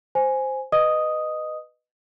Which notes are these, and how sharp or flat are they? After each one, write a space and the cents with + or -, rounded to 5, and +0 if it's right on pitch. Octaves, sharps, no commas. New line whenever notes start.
C5 +0 G#5 +0
B4 +0 D#5 -15 D#6 +0